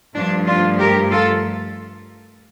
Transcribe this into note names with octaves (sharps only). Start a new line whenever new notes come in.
G2 F3 A3 D4
D4 F4
G4 A#4
F4 A4